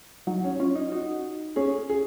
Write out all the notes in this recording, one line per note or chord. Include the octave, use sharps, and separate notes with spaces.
F#3 D#4
C#4
C#4 F4
D#4
D#4 F#4
C#4 G#4
G#4